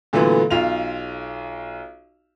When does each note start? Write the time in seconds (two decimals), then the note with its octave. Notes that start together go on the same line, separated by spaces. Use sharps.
0.13 A#2 D3 E3 F#3 A3 B3
0.50 B1 F4 F7